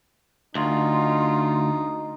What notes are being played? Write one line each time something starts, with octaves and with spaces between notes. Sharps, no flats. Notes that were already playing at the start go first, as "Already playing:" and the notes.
D2 D#4 F4